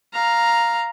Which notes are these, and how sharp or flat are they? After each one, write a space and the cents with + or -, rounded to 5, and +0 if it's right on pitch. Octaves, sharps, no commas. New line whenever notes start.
F5 +0 A#5 +0